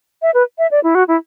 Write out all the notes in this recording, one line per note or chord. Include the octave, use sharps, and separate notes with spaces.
E5
B4
E5
D5
E4
F#4
E4